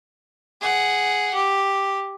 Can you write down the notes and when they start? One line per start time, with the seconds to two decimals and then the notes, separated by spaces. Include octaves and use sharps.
0.61 G#4 F#5
1.34 G4